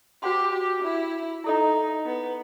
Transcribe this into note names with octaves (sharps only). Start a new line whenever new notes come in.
F#4 G4 C5 F#5 C6
G4
E4
D#4 E4 A4 D#5
B3